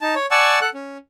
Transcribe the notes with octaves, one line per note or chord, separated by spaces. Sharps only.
D#4 A5
C#5
D5 F#5 G#5 A5 C#6 E6
A4 F#5 F#6
C#4